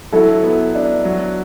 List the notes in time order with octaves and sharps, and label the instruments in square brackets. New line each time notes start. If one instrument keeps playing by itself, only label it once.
[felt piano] F#3 [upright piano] E4 A4
[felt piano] B3
D4
F#3